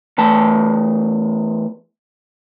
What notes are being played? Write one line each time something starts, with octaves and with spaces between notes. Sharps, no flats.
E2 A3 A5